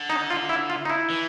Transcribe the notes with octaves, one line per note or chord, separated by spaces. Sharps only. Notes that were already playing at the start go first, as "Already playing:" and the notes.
Already playing: D3
D#4
F4
E4
F4
D#4
E4
E3